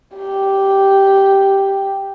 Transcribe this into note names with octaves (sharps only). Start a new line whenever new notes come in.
G4